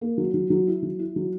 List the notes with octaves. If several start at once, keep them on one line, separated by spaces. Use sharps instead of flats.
A#3
F#3
F#3
F#3
E4
F#3
E4
F#3